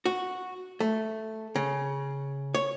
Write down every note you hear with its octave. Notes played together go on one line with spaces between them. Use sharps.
F#4
A3
C#3
C#5